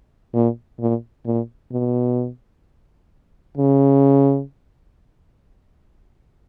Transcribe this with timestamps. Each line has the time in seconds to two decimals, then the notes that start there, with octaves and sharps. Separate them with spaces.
0.34 A#2
0.80 A#2
1.26 A#2
1.72 B2
3.57 C#3